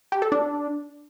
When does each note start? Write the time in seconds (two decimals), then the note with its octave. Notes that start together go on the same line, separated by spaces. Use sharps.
0.12 G4
0.22 A4
0.32 D4